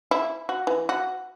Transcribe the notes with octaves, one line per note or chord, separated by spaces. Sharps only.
E4
F#4
E3
F#4